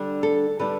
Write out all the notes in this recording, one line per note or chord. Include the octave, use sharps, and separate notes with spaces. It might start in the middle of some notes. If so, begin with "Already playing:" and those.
Already playing: D3 G3 D4
A4
D3 G3 D4 B4